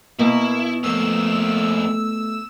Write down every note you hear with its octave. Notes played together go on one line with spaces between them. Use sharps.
B2 A#3 E4
F2 A3 A#3 E6